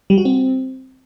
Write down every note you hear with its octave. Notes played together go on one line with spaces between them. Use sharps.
G3
F#4
C4